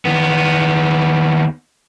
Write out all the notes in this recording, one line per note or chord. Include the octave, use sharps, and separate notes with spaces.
D#2 B3